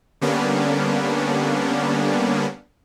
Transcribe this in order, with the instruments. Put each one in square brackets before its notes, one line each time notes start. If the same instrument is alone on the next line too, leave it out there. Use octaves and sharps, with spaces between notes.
[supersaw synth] D3 G3 A#3 B3 C#4 D4